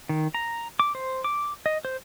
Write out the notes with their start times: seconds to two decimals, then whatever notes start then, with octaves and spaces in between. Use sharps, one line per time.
0.09 D#3
0.35 A#5
0.80 D6
0.95 C5
1.24 D6
1.66 D#5
1.85 C5